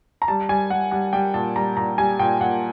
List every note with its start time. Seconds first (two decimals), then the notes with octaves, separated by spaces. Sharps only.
0.22 A#5
0.28 G3 A5
0.49 G3 G#5
0.70 G3 F#5
0.91 G3 F#5
1.13 G3 G5
1.34 A#2 A5
1.56 G3 A#5
1.77 A#2 A#5
1.98 G3 G#5
2.19 A#2 G5
2.41 A#2 F#5